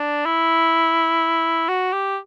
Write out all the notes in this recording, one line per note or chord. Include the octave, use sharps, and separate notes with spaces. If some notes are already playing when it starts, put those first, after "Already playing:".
Already playing: D4
E4
F#4
G4